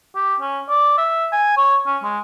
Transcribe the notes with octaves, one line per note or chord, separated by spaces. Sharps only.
G4
C#4
D5
E5
G#5
C#5
C#4
G#3